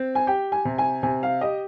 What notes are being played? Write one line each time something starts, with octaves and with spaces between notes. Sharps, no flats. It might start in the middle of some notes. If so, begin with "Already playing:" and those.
Already playing: C4
G#5
G4 G5
G#5
C3
G#5
C3 G#5
F5
G4 D#5